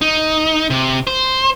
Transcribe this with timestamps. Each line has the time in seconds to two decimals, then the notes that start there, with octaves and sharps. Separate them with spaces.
0.02 D#4
0.70 C3
1.07 C5